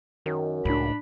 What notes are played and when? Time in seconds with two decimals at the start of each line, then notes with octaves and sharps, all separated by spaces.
0.26 F#2 D#3
0.65 C#2 A2 D4 B5